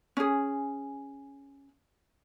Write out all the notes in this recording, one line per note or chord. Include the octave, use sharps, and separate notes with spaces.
C#4 G#4